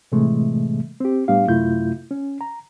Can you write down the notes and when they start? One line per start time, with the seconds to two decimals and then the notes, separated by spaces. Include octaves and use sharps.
0.12 A2 C3 E3 G#3 A3
1.00 C4 G4
1.28 A2 G3 B3 D4 G4 F5
1.48 F#2 C3 A3 E4 F4 G6
2.11 C#4
2.41 A#5